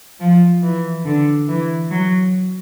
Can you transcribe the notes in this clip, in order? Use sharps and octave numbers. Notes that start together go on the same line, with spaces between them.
F3
E3
D3
E3
F#3